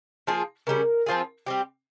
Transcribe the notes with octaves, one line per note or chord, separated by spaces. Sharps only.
F3 A#3 F4 G#4
C#3 G3 C#4 A#4
F3 C4 F4 G#4
G3 C4 G4